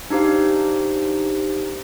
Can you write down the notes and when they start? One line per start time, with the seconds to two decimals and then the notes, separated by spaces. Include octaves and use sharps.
0.10 D4 D#4 G4 C5 F5